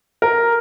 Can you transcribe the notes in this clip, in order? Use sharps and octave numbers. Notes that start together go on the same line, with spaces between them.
A#4